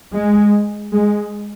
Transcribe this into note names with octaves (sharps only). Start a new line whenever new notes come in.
G#3
G#3